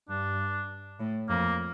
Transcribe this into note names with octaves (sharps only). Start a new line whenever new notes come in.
G2 D4
A2
F2 A#3